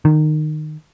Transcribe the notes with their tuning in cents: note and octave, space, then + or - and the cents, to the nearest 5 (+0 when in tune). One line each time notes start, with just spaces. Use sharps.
D#3 -20